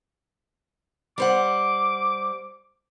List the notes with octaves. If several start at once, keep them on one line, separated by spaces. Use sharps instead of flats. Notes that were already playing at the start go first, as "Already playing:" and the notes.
G3 C5 F#5 D6